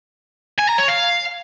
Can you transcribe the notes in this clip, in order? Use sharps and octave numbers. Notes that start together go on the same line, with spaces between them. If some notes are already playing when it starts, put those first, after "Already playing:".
G#5
A#5
C#5
F5